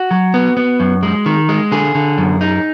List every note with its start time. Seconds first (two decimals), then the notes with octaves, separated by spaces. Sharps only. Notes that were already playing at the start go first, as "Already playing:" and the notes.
Already playing: F#4
0.11 F#3
0.34 B3
0.57 B3
0.80 F#2
1.03 G#3
1.26 D#3
1.49 G#3
1.72 D3 G#4
1.95 D3
2.18 F#2
2.41 D#4